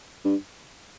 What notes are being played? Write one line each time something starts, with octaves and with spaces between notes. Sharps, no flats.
G2